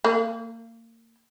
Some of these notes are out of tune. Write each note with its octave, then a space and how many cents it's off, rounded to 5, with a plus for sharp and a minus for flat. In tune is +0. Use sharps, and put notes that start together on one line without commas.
A#3 -30